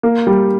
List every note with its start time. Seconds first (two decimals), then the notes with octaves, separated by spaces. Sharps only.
0.03 A#3
0.27 G3